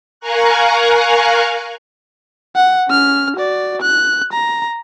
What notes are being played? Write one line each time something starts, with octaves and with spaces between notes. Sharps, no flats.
A#4 F5 G#5 A#5 C#6 F#6
F#5
C#4 F6
F#4 D5
F#6
A#5